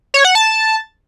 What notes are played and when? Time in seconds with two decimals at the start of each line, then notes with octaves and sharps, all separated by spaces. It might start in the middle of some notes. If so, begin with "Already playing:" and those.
0.14 C#5
0.25 F#5
0.35 A5